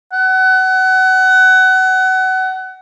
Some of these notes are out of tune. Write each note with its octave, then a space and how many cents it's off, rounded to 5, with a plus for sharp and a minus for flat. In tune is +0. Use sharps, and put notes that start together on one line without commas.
F#5 +25